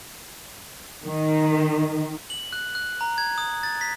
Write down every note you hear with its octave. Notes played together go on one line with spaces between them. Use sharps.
D#3
F#7
F#6
F#6
A#5
G#6
D#6
A6
B6